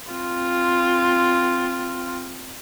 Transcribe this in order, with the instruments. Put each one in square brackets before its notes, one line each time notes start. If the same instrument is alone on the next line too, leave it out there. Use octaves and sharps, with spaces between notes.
[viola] C4 F4